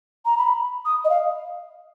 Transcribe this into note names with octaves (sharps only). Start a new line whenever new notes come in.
A#5
B5
D#6
D#5
F5